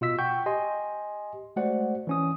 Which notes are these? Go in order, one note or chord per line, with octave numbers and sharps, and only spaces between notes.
B2 F4 D#5 E6 B6
F#5 G5 C#6 G6
G4 D#5 G#5 C6
G#3 A3 F#4 C5 D5 F#5
E3 C#4 D#6